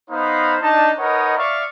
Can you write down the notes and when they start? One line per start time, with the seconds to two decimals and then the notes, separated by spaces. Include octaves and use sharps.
0.10 B3 D#4 C5 F5 A#5 B5
0.61 D4 D#4 A5
0.98 D#4 A#4 B4 C#5 D#5 F#5
1.37 D5 E5 F5 C#6